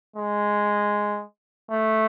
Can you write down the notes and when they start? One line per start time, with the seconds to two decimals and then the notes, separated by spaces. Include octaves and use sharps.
0.16 G#3
1.70 A3